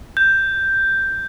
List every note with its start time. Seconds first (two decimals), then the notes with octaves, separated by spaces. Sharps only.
0.17 G6